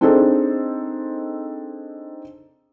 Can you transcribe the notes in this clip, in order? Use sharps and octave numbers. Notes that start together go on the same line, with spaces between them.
C4 D4 D#4 G#4 A4 C5